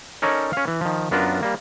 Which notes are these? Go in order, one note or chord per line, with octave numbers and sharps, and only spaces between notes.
C#4 D#4 A4 A#4 C#5 D5
C#4 F5
E3
D#3 F3
F#2 B3 D4 F4 A#4
G3 A#3